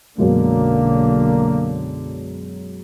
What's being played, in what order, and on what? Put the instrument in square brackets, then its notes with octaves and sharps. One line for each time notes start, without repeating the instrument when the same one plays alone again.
[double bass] B1 D3 [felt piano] F#2 B2 G#3 [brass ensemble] A#3